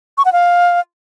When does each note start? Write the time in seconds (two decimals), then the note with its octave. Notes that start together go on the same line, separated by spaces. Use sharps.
0.18 C#6
0.25 F#5
0.33 F5